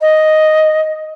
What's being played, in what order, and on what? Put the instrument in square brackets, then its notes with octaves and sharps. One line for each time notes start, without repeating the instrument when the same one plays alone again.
[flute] D#5